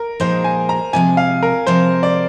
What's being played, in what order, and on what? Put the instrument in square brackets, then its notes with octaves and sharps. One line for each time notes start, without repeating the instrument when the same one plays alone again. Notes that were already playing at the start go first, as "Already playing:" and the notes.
Already playing: [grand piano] A#4
[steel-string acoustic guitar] A#2 F3 G#3 D#4 G#4 [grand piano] C5
[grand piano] G#5
A#5
[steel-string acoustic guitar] C3 F3 G#3 [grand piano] G#5
[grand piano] F5
A#4
[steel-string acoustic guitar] C3 F3 G#3 [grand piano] C5
[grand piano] D5